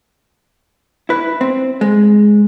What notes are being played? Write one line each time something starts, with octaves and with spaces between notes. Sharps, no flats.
E4 B4
C4
G#3